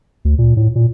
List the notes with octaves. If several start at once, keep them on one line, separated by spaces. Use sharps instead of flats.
D2
A#2
A2
A#2